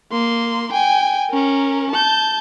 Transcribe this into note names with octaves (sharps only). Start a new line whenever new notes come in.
A#3 C6
G5 G#5
C#4 A#4
A5 G6